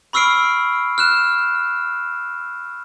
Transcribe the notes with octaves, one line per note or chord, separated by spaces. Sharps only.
B5 C#6 E6 F6 C7 D7
F6 F#6 E7